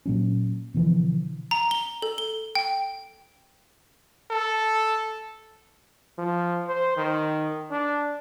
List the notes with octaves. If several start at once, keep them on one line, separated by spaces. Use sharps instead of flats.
A#2 F#3 C#4
B2 D3 E3 F3
A#5
G7
A4
G7
G5
A4
F3
C5
D#3
D4